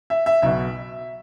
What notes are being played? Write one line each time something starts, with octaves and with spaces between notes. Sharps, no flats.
E5
E5
B1 B2 E5